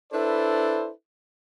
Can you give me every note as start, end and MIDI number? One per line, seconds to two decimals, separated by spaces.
0.12 0.90 62
0.12 0.90 64
0.12 0.90 69
0.12 0.90 71
0.12 0.90 72
0.12 0.90 74